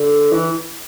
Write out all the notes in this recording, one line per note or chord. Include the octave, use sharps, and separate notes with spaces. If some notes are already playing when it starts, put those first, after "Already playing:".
Already playing: D3
E3